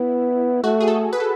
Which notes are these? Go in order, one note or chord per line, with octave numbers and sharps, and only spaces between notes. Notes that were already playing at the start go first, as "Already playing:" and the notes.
Already playing: B3 E4
A3 F#4
G#4
A4
B4
A4